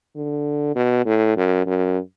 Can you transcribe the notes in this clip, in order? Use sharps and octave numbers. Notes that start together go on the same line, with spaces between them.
D3
B2
A2
F#2
F#2